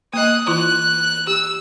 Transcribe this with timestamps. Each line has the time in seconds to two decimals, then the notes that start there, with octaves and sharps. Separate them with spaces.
0.14 A#3 D#5 D#6 F#6
0.47 E3 E4 F4 F#6
1.27 G4 E6